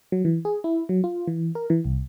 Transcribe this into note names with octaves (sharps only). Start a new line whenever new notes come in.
F#3
E3
G#4
E4
F#3
F4
E3
A#4
E3
C2